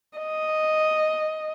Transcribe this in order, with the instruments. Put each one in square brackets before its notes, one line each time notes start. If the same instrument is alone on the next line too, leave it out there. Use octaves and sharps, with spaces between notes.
[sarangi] D#5